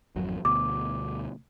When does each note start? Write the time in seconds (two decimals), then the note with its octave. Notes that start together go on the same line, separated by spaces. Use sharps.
0.16 G#1 F2 F#3
0.45 D2 B2 D6